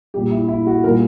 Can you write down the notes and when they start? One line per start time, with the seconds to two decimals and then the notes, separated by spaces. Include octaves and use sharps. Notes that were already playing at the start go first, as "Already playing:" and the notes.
0.14 A#2 G3 G4
0.32 E4
0.48 E4
0.67 F#4
0.84 A#2 G3 A#4